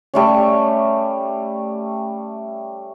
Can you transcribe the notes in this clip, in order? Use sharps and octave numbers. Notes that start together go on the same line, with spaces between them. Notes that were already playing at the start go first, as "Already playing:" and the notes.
G3 A3 C#4